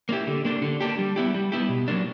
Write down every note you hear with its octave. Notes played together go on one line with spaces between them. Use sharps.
A#3 C#4 E4 G4
D3
A#3 D4 G4
D3
A#3 D4 G4
G3
B3 E4 G4
G3
B3 E4 G4
B2
F#3 A#3 D4